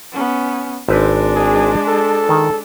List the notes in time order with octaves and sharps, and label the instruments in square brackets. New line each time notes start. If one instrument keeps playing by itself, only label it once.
[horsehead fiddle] B3 C#4
[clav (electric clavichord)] G#1 C4 B4 [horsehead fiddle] G#3 D4
[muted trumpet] G#4
A4
[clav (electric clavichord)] D#3